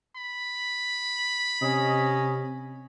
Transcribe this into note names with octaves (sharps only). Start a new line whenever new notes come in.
B5
C3 C#4 D#5